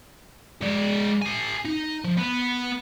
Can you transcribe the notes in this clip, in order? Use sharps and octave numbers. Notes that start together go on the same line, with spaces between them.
G#3 D5
A4 G#5
D#4
F3
B3 F#5